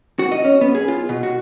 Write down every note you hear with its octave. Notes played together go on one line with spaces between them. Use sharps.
F#4
D#5
C#4
B3
G#4
F4
B2
F#4